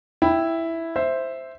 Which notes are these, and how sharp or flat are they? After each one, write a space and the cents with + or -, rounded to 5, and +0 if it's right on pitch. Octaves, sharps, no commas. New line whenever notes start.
E4 +0 G5 +0
C5 +0 E5 +0